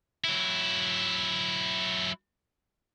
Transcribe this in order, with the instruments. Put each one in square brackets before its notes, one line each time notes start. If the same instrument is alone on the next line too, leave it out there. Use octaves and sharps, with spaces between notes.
[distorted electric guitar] F#3 E4